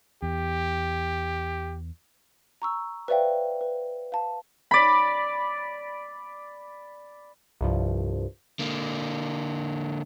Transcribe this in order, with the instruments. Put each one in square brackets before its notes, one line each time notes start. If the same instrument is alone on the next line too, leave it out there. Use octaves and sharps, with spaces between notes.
[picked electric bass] E2 [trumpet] G4
[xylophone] A#5 C#6 E6
B4 C5 D5 E5 F5 G5
B4
F5 A5
[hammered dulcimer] D5 B5
[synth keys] C2 G2 F3
[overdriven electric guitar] D3 A#3